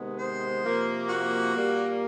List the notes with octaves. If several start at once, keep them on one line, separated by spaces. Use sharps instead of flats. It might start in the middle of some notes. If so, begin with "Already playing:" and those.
Already playing: C3 D#3 G#3 B3
C5
C3 F3 A#3
F#4
A#2 G3 A#3